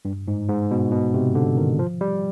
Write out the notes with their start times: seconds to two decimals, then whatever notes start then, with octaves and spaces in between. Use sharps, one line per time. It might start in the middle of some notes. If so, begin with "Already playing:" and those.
0.05 G2
0.28 G#2
0.49 G#2
0.71 B2
0.92 B2
1.14 C3
1.35 D3
1.57 D#3
1.79 F3
2.01 G3